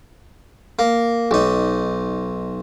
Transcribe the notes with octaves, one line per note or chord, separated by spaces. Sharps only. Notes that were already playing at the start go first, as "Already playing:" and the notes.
A#3
B1 D#4